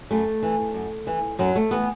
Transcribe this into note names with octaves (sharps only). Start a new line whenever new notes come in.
F#2 A3
E3
F#2
E3
F#2 F#3
A3
E3 B3